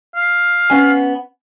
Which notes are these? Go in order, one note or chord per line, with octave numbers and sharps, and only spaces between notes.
F5
B3 C#4 G#5